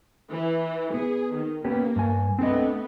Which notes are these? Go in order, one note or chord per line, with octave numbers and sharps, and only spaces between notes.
E3
B3 G#4
D#3
A#3 B3 C#4 G4
G2 G#5
A3 B3 C4 D4 D#5